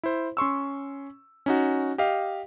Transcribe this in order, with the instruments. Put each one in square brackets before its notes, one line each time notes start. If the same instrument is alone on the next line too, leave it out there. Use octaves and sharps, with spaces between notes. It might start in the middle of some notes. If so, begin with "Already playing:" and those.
[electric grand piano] E4 C5
C#4 C6 C#6 E6
C#4 D#4 F#4
G4 D#5 F5